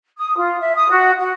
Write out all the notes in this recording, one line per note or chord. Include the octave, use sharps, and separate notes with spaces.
D#6
F4
E5
D#6
F#4
F#4